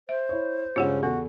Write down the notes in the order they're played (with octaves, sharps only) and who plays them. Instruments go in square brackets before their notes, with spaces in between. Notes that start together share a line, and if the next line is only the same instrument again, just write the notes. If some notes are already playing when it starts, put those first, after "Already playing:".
[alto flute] C5 [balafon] E5
[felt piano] E4 C#5
[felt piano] G2 C#3 G#3 [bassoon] C#4 [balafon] F4 G4 F#5
[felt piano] E2 A4 [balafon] B3 [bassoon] F#4